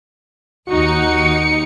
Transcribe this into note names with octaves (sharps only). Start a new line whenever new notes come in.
D#2 D#4 F#4 C#7